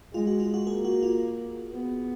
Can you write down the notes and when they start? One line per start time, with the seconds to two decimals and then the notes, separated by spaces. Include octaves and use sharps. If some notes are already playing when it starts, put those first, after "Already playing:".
0.14 G#3 F4
0.27 F#4
0.40 F4
0.54 F#4
0.67 A#3 G#4
0.85 F#4
1.02 F4
1.73 B3